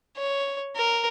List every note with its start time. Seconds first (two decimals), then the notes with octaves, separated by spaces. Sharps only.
0.17 C#5
0.76 A#4